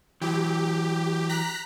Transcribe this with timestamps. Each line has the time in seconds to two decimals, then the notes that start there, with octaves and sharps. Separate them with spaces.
0.22 E3 F#3 G4
1.29 A#5 F#6 B6